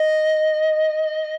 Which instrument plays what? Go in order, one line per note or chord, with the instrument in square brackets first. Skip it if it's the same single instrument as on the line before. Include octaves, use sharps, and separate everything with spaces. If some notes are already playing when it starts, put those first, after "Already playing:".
Already playing: [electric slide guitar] D#5